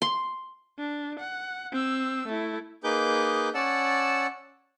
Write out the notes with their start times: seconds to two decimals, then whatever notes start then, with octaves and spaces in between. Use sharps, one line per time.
0.02 C6
0.78 D4
1.20 F#5
1.72 C4 E6
2.28 A3 E4
2.84 A#3 D#4 G#4 B4 D6 G6
3.54 C#4 D5 F#5 A5 E6